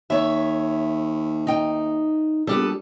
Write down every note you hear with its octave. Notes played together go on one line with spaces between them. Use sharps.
D#2 C#5 E5
D#4 G5
A#1 G3 B3 G4 A4